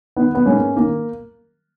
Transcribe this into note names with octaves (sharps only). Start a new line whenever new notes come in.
D#3 B3
B3
G#2 A#3 C#4
D#3 A#3